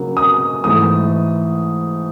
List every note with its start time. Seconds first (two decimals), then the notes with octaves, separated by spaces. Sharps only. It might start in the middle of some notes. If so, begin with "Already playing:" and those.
Already playing: C#3 F#3 A#3
0.17 D#6
0.64 G#2 E3 A3 D#6